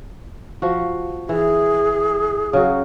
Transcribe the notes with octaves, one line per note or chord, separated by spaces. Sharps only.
F3 F#4
E3 G#4
C#3 F#3 F#4